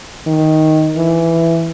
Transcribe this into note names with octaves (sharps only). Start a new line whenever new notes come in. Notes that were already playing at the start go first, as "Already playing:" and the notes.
D#3
E3